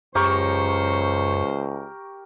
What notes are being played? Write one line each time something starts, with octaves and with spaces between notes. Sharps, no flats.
C#2 F#2 G4 A#4 C5 C#5 C#6